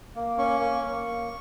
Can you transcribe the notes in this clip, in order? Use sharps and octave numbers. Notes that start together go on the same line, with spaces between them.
A#3
C#4 C#6
A#3
A#3